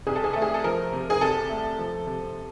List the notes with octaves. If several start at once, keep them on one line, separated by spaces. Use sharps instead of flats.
C2 G#4
A4
G#4
A3 A4
G#4
A4
F3 A#4
C3
G#4
C2 A4
A3
F3
C3